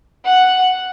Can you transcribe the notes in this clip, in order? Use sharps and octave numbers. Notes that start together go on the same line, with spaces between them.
F#5